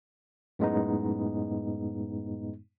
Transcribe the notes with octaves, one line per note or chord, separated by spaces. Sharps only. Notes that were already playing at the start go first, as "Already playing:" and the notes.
F#2 A2 G#3 B3 D#4